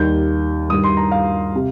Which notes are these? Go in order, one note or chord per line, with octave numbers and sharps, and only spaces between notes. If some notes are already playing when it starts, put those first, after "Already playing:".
Already playing: D#2 D#3 G3 G6
G2 D#3 G3 D#6
C6
A#5
F5
C3